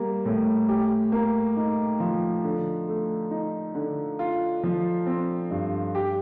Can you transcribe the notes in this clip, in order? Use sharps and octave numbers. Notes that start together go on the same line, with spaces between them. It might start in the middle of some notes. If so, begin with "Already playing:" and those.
Already playing: G3 A#3
A2
G4
A#3
D#4
F3
D3
A3
D#4
D3
F4
F3
C4
G2
G4